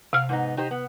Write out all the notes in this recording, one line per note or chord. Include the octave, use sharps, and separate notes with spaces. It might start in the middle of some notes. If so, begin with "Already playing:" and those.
C3 F5 F6
G#2 B3 D#4
D#4 G4 C5
B3